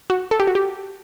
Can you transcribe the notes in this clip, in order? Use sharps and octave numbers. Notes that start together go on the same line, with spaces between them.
F#4
A4
G4
F#4
G4